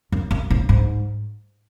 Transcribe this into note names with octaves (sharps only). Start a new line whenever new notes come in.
F#2
F#2
A2
G#2